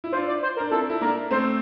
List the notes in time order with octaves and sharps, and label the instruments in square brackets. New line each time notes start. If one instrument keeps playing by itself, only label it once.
[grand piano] E4
[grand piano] D4 F4 [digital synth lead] C5
[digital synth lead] D5
C5
A#4
[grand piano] D4
[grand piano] C4 E4 [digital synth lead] A4
[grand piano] E4
[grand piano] A#3 D4 [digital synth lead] A#4
[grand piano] A3 C4 [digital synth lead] C5